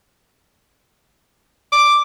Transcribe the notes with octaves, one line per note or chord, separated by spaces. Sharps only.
D6